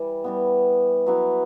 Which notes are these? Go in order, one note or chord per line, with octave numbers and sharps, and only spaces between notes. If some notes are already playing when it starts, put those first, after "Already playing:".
Already playing: E3 G3
E3 G3 B3
F#3 B3 E4